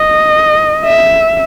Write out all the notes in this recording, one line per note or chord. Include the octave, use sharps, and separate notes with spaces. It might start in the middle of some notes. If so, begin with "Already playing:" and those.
Already playing: D#5
E5